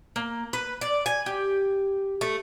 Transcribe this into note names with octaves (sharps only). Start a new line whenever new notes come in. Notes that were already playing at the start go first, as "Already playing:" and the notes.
A#3
B4
D5
G#5
G4
A3